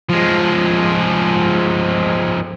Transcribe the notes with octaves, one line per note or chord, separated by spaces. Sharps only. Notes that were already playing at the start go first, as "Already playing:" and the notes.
F3 G#3